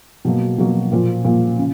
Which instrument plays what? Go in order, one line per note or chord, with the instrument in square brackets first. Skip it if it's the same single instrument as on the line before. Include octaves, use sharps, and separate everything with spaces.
[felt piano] B2 F#3 A#3
B2 F#3 A#3
A#2 F3 A#3
A#2 F3 A#3
C#3